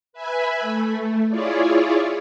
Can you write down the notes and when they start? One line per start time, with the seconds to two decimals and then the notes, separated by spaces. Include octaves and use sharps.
0.13 B4 E5 G#5 B5
0.60 A3
1.29 E4 F4 G#4 C#5 D5